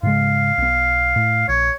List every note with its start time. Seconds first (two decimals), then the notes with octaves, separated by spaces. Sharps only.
0.03 G#2 C#3 G#3 F5
0.58 B1 B3
1.16 A2
1.49 A#1 C#5